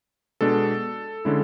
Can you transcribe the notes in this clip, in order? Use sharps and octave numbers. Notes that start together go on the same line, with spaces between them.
B2 G#3 D4 A4
D3 G#3 C#4 E4